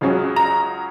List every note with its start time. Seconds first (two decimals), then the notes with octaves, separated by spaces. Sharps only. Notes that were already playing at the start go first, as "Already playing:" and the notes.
0.01 C#2 C#3 F#3 C#4
0.36 A#5